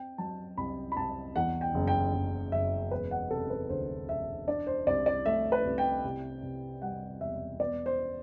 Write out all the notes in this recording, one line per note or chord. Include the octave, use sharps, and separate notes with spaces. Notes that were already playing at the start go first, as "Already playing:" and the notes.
Already playing: C4 G5
F#3 A5
C2 B5
B5
C2 A5
E2 F#5
G5
F#1
G5
F#1
F#1 E5
E1 B4
F#5
C3 A4
B4
D2 C5
E1 E5
D4 D5
C5
C2 D5
D5
A3 E5
B4
C2
G5
C3
C3
G3 F#5
E1 E5
B3 D5
C5